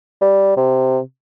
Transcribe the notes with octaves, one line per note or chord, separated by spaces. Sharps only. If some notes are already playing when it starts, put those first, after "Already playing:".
G3
C3